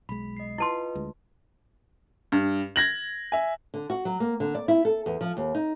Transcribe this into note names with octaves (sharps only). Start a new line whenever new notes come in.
B1 G#3 B5
D#5 C7
E4 F4 B4 D#5 A5 C6
D2 G#3
G2
G#6 A#6 F#7
E5 G#5
D3
F#4
F#3
A#3
D3
D5
E4
A4
E2
F3
D#2
D#4